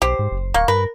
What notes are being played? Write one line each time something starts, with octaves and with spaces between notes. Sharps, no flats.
B1 G4 C5
G#2
F#1
D1 A#3 C#6
G2 A#4 B4